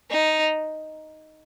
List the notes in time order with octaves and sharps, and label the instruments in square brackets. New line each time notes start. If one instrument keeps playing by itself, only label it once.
[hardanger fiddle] D#4